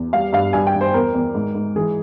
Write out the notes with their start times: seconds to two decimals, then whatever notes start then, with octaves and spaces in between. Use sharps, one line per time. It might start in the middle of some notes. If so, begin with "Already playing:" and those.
Already playing: E2
0.13 G3 F5
0.33 G2 F5
0.53 G2 G#5
0.67 G5
0.74 G2
0.81 C5
0.94 E2 A#4
1.15 E2
1.35 G#2
1.55 G#2
1.76 E3 G#4